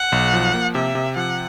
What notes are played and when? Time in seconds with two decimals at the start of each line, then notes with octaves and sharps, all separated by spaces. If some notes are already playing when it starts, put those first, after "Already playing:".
Already playing: F#5
0.12 B1
0.33 F3
0.54 A#3
0.75 C3 E5
0.95 C3
1.16 F3 F#5